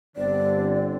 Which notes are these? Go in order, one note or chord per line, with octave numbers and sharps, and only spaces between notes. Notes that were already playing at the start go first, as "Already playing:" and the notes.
G1 D3 C4 D5